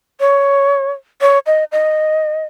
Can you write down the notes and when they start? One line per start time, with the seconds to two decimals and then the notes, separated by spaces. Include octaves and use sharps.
0.20 C#5
1.21 C#5
1.46 D#5
1.72 D#5